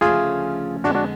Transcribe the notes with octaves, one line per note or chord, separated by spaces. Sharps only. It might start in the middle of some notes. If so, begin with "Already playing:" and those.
D2 C#3 F3 A3 C#4 F4 G#4
F2 D3 G#3 B3 D4 F#4
D4 F#4